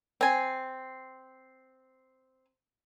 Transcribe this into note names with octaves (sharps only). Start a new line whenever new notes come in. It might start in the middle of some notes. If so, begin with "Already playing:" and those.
C4 G#5